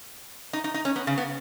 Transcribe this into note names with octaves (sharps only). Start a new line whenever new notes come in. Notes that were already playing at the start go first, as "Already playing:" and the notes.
D#4
D#4
D#4
C#4
B3
C#3
B3